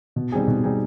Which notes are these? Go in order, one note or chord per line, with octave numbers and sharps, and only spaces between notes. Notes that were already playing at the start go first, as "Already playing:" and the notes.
B2
G3 C4 D#4 G#4
B2
G3 C4 D#4 G#4